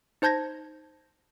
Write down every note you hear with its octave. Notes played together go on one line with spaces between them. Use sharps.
D#4 C5 A5 G6 G#6 A#6